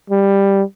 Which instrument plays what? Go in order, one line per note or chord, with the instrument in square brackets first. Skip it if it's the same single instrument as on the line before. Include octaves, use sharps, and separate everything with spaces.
[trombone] G3